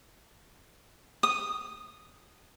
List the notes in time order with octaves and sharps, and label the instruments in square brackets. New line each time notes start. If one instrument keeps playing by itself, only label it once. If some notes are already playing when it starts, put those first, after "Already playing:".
[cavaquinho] D#6